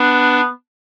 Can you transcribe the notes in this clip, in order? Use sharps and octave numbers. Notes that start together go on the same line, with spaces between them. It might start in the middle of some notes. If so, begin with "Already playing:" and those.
Already playing: B3 D4